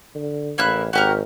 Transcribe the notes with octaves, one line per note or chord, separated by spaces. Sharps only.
D3
A1 A#3 E4 F#6
G#1 F#4 G4 A#4